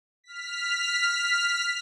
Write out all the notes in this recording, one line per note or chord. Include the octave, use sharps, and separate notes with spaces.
F6 B6